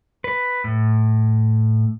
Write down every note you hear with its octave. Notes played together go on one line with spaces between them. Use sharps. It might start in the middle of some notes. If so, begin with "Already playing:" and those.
B4
A2